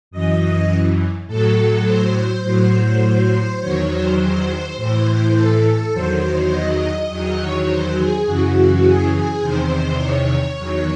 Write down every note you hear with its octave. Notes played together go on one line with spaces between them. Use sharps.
F#2 E3 D#5
A2 F#3 A4
C5
A2 F#3
E2 D#3 F#3 C#5
C5
C5
A2 E3
A4
E2 D#3 F#3 C5
D#5
E2 D#3 F#3 D#5
C#5
C5
G#4
F#2 C#3 E3 F#4
G#4
G#4
E2 C3 D#3 C5
C#5
E2 D#3 F#3